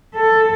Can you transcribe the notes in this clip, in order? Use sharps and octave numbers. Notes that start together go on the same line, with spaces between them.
A4